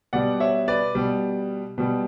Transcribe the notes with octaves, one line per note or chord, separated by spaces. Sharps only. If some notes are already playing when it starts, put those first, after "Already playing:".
B2 G3 D5 F#5
C#5 E5
B4 D5
B2 G3
B2 G3